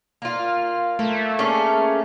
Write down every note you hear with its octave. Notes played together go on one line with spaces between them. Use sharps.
A#3 F4
A3 A#3
A#3 C#4 G#4